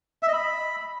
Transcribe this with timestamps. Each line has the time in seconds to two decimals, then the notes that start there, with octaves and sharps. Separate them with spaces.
0.23 E5
0.28 D#5
0.33 B5